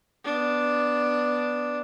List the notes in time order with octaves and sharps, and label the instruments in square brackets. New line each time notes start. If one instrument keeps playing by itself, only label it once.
[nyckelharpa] B3 D4